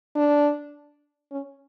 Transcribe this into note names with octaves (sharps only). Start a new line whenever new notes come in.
D4
C#4